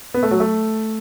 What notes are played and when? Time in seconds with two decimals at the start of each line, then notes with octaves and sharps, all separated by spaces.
0.14 B3
0.23 A3
0.31 F#3
0.40 A3